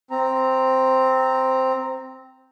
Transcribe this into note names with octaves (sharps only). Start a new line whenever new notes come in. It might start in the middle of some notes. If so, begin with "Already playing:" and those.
C4 A#5